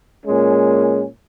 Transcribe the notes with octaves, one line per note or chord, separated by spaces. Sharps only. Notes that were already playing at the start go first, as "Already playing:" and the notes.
A#2 G#3 C#4